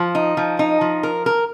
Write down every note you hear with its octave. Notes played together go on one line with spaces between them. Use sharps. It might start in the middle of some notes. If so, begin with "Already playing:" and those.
Already playing: F3
D#4
F3
D#4
F3
A#4
A#4